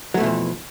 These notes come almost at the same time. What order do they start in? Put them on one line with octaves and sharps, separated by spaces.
F#3 A3 B2 E3 F2